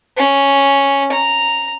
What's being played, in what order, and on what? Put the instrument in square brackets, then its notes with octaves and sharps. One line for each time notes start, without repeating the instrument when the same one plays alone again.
[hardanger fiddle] C#4
A#5